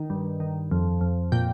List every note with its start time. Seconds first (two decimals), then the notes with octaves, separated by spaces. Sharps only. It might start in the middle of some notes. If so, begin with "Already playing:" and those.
Already playing: D#3
0.10 G2
0.40 D#3
0.71 F2
1.01 F2
1.32 A#2 G5